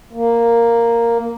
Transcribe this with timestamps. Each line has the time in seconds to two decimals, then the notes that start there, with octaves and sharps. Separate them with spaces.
0.13 A#3